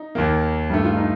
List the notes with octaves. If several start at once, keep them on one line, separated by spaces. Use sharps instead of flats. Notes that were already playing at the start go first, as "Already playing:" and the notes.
Already playing: D#4
D#2 D#3 A#3
G2 D#3 A3
F4
D#4